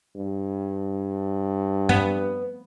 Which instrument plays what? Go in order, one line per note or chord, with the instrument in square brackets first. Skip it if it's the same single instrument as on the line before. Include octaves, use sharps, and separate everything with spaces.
[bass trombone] G2
[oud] B3